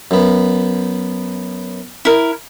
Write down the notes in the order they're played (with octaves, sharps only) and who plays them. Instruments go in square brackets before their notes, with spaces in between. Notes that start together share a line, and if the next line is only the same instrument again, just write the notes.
[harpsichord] F#2 B3
[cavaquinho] E4 A#4